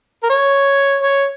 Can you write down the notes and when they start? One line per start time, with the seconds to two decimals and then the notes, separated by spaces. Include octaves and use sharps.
0.23 A#4
0.30 C#5
1.03 C#5